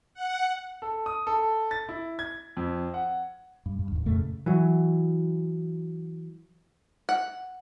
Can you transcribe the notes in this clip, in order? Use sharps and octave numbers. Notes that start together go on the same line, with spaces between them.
F#5
A4
D#6
A4
A6
E4
G#6
F2
F#5
G2
G2
D1 D#2
F2 A#2 C#3 A3
E3 F#3
F#5